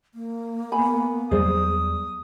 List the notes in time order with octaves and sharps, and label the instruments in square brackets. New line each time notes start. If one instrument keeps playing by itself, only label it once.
[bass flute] A#3
[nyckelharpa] B3 [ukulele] G#5 B5
[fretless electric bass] E2 F#3 G3 [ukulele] G#4 C5 D5 [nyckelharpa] D#6